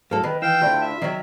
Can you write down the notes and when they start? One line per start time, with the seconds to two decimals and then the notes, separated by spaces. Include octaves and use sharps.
0.11 G#2 F#3 A#3 A4
0.24 D#3 B4
0.42 E3 F5 G5 E6
0.62 D2 D3 E4 F4
0.81 E5
1.02 D#3 F#3